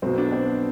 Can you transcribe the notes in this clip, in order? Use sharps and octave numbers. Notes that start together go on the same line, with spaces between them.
B1 B2 C4
B3 D4
C4
B3